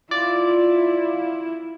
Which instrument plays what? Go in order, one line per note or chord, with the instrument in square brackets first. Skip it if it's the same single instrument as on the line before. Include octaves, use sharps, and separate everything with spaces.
[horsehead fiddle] E4 [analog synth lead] F4 [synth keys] D5